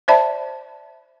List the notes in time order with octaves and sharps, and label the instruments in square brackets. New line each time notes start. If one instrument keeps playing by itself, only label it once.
[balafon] C5 D5 E5 A5 B5